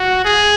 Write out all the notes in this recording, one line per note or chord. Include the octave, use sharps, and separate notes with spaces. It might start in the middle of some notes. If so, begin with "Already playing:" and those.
Already playing: F#4
G#4